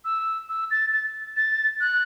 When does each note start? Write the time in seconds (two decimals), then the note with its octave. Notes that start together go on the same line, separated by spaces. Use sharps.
0.05 E6
0.49 E6
0.71 A6
0.93 A6
1.36 A6
1.81 F#6